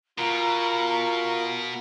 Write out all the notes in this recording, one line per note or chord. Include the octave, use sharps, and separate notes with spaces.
B2 F4 A#4 A#5